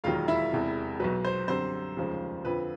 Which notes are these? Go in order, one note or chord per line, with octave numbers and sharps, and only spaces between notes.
E1 D#2 D#3 F#3 F4 F5
E4 E5
E1 E2 C3
B1 B2 F#3 B4
C5
F#2 D3 G3 C4 C5
F1 D#2 C#3 F3 G#3
F2 D3 F3 B4